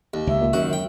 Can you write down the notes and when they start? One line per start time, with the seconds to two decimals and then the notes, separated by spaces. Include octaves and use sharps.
0.14 D#2
0.27 C#2 E5
0.41 A#2
0.53 F#2 D#3 F#4
0.73 G5